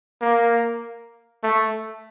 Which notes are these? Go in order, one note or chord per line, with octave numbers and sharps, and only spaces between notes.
A#3
A3